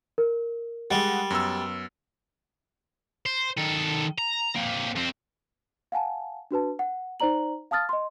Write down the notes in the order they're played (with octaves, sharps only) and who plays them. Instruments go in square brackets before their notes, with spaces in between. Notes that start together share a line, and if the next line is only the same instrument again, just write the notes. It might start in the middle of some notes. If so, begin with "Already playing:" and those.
[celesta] A#4
[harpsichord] G3 [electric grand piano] G#3 F#5
[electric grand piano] F#2 B3 E6
[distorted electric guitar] C5
D#3 A4
A#5
A#3 C4
F2 C4
[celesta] F5 F#5 G#5 A5
D4 F#4 B4 A5
F#5
D#4 C5 D5 A#5 F#7
F5 A5 D#6 F6 A6
D#5 C6